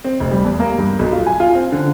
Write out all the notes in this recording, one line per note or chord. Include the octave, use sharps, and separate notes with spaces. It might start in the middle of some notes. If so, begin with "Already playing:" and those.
C4
F1
G3
E2
A#3
G2
B1
F4
G#5
F4
C4
D3